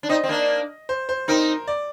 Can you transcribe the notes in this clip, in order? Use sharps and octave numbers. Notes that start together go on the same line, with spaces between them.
D4
C4 D#4 D#5
C4
A#3 D4
C5
C5
C4 D#4 A#4
D5